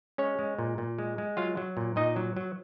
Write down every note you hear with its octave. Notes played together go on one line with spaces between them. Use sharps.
G#3 C#4 C#5
G#3
A#2
A#2
G#3
G#3
F#3 F4 F5
F#3
A#2
A#2 D#4 D#5
F#3
F#3